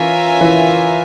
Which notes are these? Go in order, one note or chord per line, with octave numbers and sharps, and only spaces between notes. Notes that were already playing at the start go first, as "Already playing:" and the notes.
Already playing: E3 C#4 F4 A#4 E5 G#5
E3